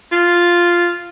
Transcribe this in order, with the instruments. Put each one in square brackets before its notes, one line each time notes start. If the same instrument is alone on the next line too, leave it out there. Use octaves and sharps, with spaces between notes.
[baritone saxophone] F4